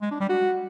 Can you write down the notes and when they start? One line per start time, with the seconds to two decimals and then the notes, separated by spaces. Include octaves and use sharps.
0.02 G#3
0.11 D4
0.20 G3
0.29 F#4